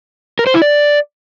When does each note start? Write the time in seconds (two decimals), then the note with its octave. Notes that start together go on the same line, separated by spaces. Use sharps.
0.39 A#4
0.47 C5
0.54 E4
0.62 D5